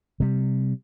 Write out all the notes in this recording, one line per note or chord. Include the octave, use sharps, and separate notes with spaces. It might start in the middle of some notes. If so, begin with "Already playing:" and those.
C3 G3